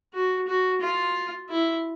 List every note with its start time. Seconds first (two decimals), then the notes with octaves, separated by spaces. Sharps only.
0.14 F#4
0.47 F#4
0.81 F4
1.50 E4